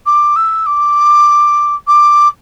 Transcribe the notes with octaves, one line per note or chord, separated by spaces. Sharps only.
D6
E6
D6
D6